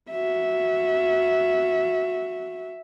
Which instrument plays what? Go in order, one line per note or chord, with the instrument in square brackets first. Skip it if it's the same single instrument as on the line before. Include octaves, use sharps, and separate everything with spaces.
[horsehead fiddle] F#4 E5